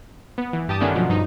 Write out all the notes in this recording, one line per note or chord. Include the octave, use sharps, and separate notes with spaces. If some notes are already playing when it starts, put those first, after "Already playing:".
B3
E3
G2 G4 A5 D#6
D3 D#3 A3 B3 C#4 D4
B2 F3 F#3
G2 D#4